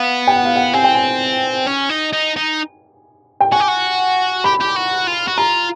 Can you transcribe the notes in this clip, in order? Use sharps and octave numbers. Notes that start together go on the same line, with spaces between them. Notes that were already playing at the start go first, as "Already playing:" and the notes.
Already playing: B3 F5
G5
F#5
F5
F#5
C4 G#5
G5
G#5
C#4
D#4
D#4
D#4
G5
F#4 G#5
G4
F#4
G4 B5
G4
F#4
F4
F#4
F4 A#5